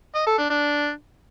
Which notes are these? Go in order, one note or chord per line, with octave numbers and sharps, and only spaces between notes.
D#5
A4
D4
D4